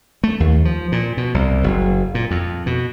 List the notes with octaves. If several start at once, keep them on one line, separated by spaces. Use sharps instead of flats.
A3
D#2
F3
A#2
B2
C2
F#1
A#2
F2
B2